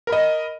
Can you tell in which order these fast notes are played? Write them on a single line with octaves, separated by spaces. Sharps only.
A#4 B5 D#5